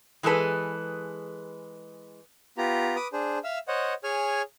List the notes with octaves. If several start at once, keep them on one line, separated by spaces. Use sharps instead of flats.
E3 G#3 G#4 A4 B4
B3 F4 G4 A#5
B4 D6 D#6
D4 G#4 C5
E5 F5 E6
C5 C#5 D#5 F#5
G#4 C#5 G#5 F6